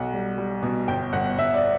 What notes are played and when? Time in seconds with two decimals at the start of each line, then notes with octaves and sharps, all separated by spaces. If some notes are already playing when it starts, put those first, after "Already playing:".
Already playing: B1 F#5
0.13 G3
0.38 G3
0.63 B2
0.88 G1 G5
1.13 G1 F#5
1.38 G1 E5
1.54 D5